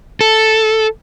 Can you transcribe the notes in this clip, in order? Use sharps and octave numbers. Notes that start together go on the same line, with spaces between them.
A4